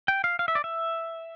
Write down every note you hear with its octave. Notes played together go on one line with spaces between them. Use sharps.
G5
F5
F5
E5
D5
E5